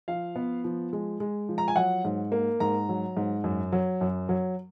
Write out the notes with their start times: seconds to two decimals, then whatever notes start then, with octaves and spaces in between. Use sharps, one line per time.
0.08 F3 F5
0.36 B3
0.64 F3
0.93 G#3
1.20 G#3
1.49 F3
1.58 A#5
1.68 G#5
1.76 F#3 F#5
2.05 G#2
2.32 A#3
2.60 G#2 A#5
2.89 F#3
3.17 G#2
3.44 F#2
3.72 F#3
4.01 F#2
4.29 F#3